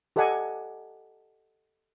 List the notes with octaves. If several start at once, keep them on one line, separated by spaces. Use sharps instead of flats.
G4 A4 D5 D#5 F#5 G#5